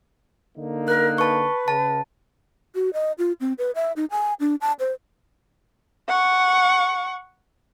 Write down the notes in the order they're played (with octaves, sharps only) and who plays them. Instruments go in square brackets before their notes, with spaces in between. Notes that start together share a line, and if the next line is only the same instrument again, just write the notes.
[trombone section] D3 A#3 D#4
[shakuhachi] A#4 [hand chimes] F#6
[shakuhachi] B4 [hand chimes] A5 C#6
[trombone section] C#3 [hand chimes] A5
[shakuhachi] F#4
D#5
F4
C4
B4
E5
D#4
G#5
D4
A5
C5
[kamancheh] F#5 C#6